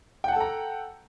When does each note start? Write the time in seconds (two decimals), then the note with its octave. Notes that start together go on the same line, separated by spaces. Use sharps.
0.24 G5
0.28 F#5
0.32 A5
0.36 A4
0.40 A#5